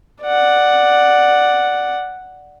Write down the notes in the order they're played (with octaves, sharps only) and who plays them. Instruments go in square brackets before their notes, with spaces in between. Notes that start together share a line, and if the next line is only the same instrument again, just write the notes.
[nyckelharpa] D5 F#5